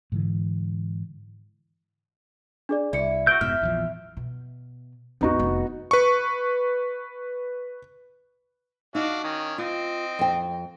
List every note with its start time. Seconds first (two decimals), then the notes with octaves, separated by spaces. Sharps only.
0.12 G#2 D3 E3
2.69 D4 G#4 D5
2.93 C2 E4 D5 C#7
3.27 F#4 E6 G6 D7 G7
3.41 F1 G#2 B2 E5 F6
3.62 A#1 E2 F3
4.17 B2
5.21 A1 E2 B3 D#4 F#4
5.39 F1 D#3
5.91 B4 C#6
8.95 D4 D#4 F#4 F5
9.24 D#3 C#4
9.58 C4 F4 D#5
10.19 F2 G5